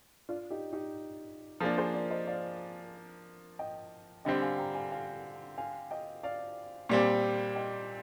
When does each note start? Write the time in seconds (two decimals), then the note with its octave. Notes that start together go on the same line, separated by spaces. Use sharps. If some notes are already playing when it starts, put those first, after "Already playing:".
0.29 D4 F4
0.50 D#4 G4
0.73 D#4 G4
1.61 F3 A#3 D4 F4 G#4
1.78 G#4 C5
1.94 A#4 D5
2.10 C5 D#5
2.27 D5 F5
3.59 D#5 G5
4.25 D3 G3 C4 D#5 G5
4.42 F5 G#5
4.58 G5 A#5
4.75 F5 G#5
4.92 F5 G#5
5.58 F5 G#5
5.91 D#5 G5
6.23 D5 F5
6.89 A#2 G3 C4 D5 F5
7.56 D#5 G5